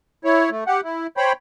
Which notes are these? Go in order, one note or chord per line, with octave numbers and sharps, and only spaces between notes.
E4 C#5
A3
G4 F#5
E4
C5 C#5 G5 B5